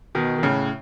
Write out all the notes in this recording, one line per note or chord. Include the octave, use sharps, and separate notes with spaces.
B2 D#3
D#3
A2 C#3